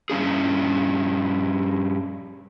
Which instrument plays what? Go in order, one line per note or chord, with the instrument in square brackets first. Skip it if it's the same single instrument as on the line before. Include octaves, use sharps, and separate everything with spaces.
[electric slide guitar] G2 F3 C#4 G#4